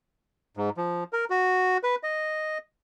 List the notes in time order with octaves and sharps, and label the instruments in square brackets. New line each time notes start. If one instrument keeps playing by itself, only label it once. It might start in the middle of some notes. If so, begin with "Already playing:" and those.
[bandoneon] G#2
F3
A#4
F#4
B4
D#5